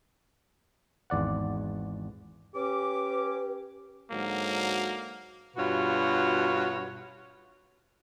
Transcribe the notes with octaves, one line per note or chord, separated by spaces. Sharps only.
G#1 E2 D5 F#5
C#4 G4 B4 D6
G#2 D3 F#3 A#3
G2 B2 F4 F#4 C#5